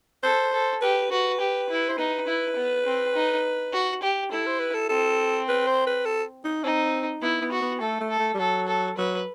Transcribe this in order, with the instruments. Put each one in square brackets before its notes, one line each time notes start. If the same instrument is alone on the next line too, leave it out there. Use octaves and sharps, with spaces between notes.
[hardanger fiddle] A4 [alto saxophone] C5
[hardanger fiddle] A4
[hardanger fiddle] G4 [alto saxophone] B4
[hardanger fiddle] F#4 [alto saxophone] B4
[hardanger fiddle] G4
E4
[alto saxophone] C5
[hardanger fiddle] D#4 [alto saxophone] B4
[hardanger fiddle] E4
B3
C4
D#4
F#4
G4
[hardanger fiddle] E4 [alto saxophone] A4
[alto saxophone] C5
B4
A4
[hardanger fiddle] C4 [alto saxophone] A4
[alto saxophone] B4
C5
B4
A4
D#4
[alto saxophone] C4 [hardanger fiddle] D#4
[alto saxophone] B3 [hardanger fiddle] E4
[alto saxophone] B3
[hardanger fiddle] F#4
[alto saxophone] B3
[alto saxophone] A3 [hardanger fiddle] A4
[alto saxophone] A3
[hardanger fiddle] A4
[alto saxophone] A3
G3
[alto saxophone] F#3 [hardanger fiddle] A4
[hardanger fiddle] A4
[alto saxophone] F#3 [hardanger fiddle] B4